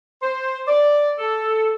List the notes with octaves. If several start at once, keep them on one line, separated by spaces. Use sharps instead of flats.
C5
D5
A4